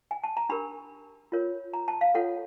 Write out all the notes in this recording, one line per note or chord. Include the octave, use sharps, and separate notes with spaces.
G#5
A5
A#5
D4 G4 A#4 B5
F4 A#4 C#5
A#5
A5
F5
F4 A4 C#5 F#5